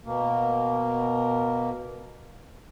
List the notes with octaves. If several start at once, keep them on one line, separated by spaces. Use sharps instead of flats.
B2 A#3